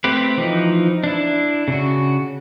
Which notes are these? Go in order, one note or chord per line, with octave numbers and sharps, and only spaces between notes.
A3 C4 G4 B4
E3 F3 D#4
D4 E4
C#3 F#4